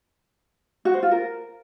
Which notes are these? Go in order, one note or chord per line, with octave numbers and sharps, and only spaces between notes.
F#4
C5
F4
A#4